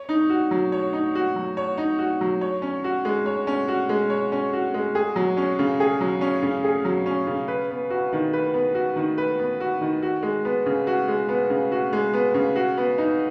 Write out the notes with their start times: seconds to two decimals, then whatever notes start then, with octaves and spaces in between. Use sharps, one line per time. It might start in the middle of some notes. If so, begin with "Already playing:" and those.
Already playing: C#5
0.09 D#4
0.30 F#4
0.51 F#3
0.72 C#5
0.93 D#4
1.15 F#4
1.36 F#3
1.57 C#5
1.77 D#4
1.99 F#4
2.21 F#3
2.41 C#5
2.62 C#4
2.84 F#4
3.05 G#3
3.26 C#5
3.47 C#4
3.68 F#4
3.89 G#3
4.10 C#5
4.32 C#4
4.53 F#4
4.74 G#3
4.95 G#4
5.16 F#3
5.37 C#4
5.59 C#3
5.80 G#4
6.01 F#3
6.21 C#4
6.42 C#3
6.64 G#4
6.85 F#3
7.06 C#4
7.27 C#3
7.48 B4
7.70 B3
7.90 F#4
8.13 D#3
8.33 B4
8.54 B3
8.75 F#4
8.96 D#3
9.18 B4
9.39 B3
9.60 F#4
9.81 D#3
10.02 F#4
10.23 G#3
10.45 B3
10.66 C#3
10.87 F#4
11.08 G#3
11.29 B3
11.50 C#3
11.72 F#4
11.93 G#3
12.14 B3
12.34 C#3
12.56 F#4
12.77 B3
12.98 D#4